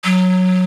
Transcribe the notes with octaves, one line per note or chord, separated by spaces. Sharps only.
F#3